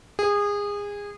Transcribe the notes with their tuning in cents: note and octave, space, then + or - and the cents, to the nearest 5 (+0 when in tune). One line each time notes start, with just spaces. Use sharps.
G#4 -25